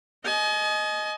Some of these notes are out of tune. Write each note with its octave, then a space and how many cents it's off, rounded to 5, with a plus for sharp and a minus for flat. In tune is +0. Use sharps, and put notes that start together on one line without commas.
D#5 +0 G#5 +40